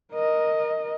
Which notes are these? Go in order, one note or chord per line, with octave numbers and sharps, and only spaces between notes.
A#4 D#5